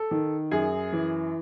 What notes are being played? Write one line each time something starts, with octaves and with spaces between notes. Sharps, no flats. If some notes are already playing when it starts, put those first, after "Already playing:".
Already playing: A4
D#3
F#2 G#4
E3